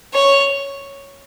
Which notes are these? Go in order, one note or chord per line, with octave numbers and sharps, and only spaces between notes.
C#5